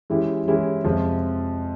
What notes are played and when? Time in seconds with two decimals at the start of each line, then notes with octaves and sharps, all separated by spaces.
0.10 E3 G#3 C#4 E4 G4
0.47 E3 G#3 C#4 E4 G4
0.84 F2 C3 F3 G#3